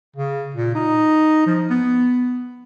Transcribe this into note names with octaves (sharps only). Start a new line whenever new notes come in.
C#3
A#2
D#4
F3
B3